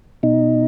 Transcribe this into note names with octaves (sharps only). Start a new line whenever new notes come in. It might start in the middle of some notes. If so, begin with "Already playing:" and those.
B2 D#4